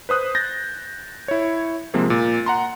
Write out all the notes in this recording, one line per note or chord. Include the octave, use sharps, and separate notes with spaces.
B4 C5 D#6 F#6
G6 A6 A#6
E4 C#5
C3 F3 G#3 A#3 C4
A#2
F#5 A#5 C6